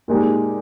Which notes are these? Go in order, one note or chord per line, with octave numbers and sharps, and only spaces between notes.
A#2 G#3 D#4 G4